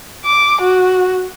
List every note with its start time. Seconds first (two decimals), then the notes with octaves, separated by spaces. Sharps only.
0.25 D6
0.61 F#4